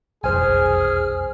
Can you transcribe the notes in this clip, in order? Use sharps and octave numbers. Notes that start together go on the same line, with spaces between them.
F1 B1 E2 G#4 C5 G#5 F6